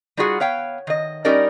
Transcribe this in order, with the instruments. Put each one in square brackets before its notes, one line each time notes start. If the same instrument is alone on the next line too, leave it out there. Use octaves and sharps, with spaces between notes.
[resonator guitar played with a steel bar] G3 D#4 F4 F#4 G#4 F#5
B3 C#5 F5 G5
D#3 D#5
G3 C#4 D#4 G4 A#4 D5